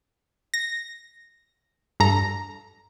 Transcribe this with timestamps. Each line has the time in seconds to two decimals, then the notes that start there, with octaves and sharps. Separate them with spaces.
0.54 A#6
2.00 G2 A4 A#5